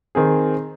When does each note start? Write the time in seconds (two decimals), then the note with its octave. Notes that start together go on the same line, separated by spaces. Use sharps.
0.15 D#3 C4 G#4